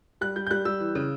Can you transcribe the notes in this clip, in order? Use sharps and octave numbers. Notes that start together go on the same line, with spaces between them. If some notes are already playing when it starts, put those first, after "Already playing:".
G3 F#6
G3 G6
G6
G3 F#6
G3 E6
E3
C#3